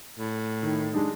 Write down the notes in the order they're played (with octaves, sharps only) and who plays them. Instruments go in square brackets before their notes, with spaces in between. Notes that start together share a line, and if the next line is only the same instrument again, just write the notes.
[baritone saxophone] A2
[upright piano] D#3
G#3 D4 D#4